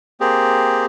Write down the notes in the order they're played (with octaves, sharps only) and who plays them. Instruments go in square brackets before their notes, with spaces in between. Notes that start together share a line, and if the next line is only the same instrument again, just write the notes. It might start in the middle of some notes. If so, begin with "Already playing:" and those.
[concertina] A#3 C4 G4 G#4